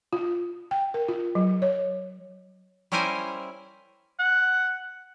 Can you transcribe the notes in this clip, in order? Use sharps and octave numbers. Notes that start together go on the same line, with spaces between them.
F4
G5
A#4
F4
F#3
C#5
G3 C#4 E4 A#4 C5 G#5
F#5